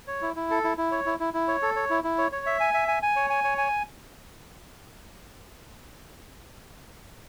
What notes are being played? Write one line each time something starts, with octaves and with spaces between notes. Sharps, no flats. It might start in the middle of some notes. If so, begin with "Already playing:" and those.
C#5
E4
E4
A4
E4
E4
C#5
E4
E4
E4
C#5
A4
C#5
E4
E4
C#5
C#5
E5
G#5
E5
G#5
G#5
C#5
G#5
C#5
G#5